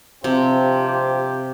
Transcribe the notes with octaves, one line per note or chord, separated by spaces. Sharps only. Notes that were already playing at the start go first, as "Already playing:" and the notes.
G2 C3 F3 C4 G4
G4